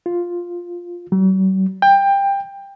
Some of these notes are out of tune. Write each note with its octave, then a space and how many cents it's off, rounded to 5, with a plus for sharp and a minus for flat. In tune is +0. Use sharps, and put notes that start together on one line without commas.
F4 +5
F#3 +45
G5 +20